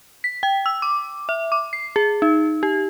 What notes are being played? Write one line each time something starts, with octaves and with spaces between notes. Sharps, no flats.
B6
G5
E6
D6
E5
D6
C7
G#4
D#4
G4